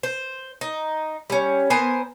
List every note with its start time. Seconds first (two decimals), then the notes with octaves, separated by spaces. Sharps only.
0.03 C5
0.61 D#4
1.30 G3 C#4
1.70 B3 A#4 C5 G#5